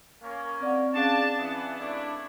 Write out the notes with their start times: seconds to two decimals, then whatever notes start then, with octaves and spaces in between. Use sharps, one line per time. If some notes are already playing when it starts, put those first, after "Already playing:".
0.22 A#3 C#4
0.60 C4 D5 F#5
0.94 C#4 D4 G#4 F5 A5
1.39 E3 B3
1.80 A3 D4 E4